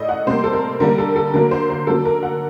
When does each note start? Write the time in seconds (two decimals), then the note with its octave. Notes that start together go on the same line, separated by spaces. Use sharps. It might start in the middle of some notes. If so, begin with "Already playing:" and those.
Already playing: A2 A3 D5 D#5
0.09 F#5
0.27 C3 G3 A#3 C5
0.44 A4
0.53 A#4
0.80 D3 G3 A#3 A#4
0.98 A4
1.16 A4
1.34 D3 F#3 A#3 A#4
1.51 C5
1.70 C5
1.87 D3 F#3 A#3 A4
2.05 A#4
2.23 F#5